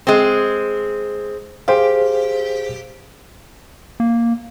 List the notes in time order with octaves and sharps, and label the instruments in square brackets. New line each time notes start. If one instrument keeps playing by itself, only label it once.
[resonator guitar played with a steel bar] G#3 C4
[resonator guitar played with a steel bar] G4 [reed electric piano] G#4 C5 F5
[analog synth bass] A#3